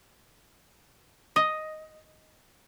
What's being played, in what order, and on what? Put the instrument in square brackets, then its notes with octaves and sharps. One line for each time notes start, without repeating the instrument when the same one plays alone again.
[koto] D#5